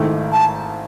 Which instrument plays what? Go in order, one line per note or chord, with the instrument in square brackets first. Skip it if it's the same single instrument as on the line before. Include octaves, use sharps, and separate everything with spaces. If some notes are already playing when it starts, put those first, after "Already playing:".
Already playing: [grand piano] G#1 G#2 D#3 A3 E4
[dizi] A5